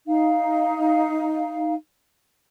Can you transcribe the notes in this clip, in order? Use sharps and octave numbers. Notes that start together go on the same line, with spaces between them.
D#4 F5